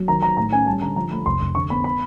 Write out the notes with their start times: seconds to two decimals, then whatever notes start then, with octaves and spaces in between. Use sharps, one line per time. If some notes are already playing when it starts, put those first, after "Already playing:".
Already playing: F#3
0.08 D#3 A#5
0.22 D#3 A#5
0.37 A2 A#5
0.52 C#4 G#5
0.66 G3 A5
0.82 D3 A#5
0.96 F3 A#5
1.11 A3 B5
1.26 F1 C6
1.41 F1
1.55 D3 C#6
1.70 B3 B5
1.84 B5